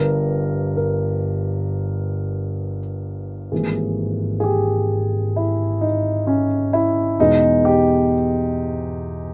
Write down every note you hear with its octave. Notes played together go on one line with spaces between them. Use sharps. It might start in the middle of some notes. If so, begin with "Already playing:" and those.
Already playing: G1 G2 G3 A#4
A#4
G#1 G#2 E3 G3 A#3 G#4
G#4
G4
E4
D#4
C#4
E4
E2 B2 G#3 D#4
G4